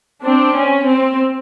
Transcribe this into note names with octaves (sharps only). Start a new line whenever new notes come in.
C4 D4
C#4
C4